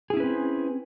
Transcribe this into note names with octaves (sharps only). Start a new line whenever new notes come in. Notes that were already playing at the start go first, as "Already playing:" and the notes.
C4 C#4 E4 G#4 B4